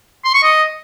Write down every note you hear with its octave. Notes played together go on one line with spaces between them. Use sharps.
C6
C#6
D#5